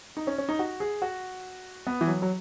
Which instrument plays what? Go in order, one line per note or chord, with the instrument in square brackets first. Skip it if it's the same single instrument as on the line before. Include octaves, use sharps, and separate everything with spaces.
[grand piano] D#4
C#4
C#4
D#4
F#4
G#4
F#4
B3
E3
F#3
F#3